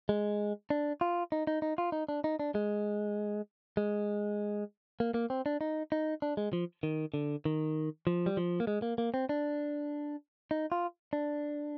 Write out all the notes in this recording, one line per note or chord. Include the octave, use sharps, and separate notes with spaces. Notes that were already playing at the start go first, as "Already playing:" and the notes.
G#3
D4
F4
D#4
D#4
D#4
F4
D#4
D4
D#4
D4
G#3
G#3
A#3
A#3
C4
D4
D#4
D#4
D4
G#3
F3
D#3
D3
D#3
F3
G3
F3
A#3
G#3
A#3
A#3
C4
D4
D#4
F4
D4